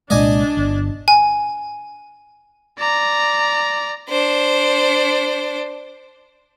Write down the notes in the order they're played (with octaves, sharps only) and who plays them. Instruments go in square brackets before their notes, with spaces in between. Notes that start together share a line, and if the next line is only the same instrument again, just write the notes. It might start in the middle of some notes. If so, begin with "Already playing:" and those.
[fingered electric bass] C2 A#2 G#3 [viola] D4 [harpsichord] D5 D#5 G#5
[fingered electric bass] G1
[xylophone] G#5
[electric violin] D5 A#5
[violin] D4 C5